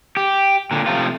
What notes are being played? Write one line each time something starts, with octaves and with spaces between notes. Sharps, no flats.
G4
A#2 D3
C3 F3 A3 F4